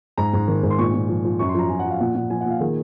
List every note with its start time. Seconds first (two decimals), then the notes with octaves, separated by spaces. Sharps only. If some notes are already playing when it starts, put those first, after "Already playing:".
0.18 G#2 A#5
0.33 G#2
0.48 D#3
0.63 G#2
0.70 C6
0.78 A#2 C#6
0.94 A#2
1.09 F3
1.25 F3
1.39 F#2 C#6
1.49 C6
1.55 F3 A#5
1.69 F3 G#5
1.79 F#5
1.85 F3
1.90 F5
2.00 A#2 F#5
2.15 A#2 F#5
2.30 F3 G#5
2.41 F#5
2.46 A#2 F5
2.61 D#3 G#4